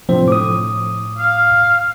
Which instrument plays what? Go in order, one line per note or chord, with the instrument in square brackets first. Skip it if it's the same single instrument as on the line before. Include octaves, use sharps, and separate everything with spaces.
[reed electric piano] A2 C3 C4 [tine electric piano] F3 D4 C5
[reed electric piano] A2 [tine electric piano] D6 D#6
[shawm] F5